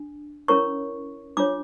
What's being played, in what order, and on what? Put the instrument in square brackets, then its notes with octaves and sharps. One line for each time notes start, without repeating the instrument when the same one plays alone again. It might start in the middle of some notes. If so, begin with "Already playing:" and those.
Already playing: [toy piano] D4
C#4 E4 A#4 C#5 C#6
D4 F4 C#5 D6